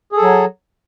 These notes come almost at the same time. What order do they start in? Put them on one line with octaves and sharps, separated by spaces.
G#4 A4 F#3